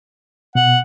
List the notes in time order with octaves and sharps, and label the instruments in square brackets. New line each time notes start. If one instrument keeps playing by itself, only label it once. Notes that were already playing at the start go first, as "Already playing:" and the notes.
[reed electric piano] B2 [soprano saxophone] F#5